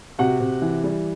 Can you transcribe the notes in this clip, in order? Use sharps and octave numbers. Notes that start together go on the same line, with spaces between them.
C3 F#4 F#5
C3
E3
G3